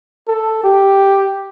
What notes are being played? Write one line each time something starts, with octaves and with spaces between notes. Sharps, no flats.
A4
G4